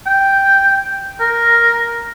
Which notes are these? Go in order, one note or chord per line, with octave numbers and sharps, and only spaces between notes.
G5
A#4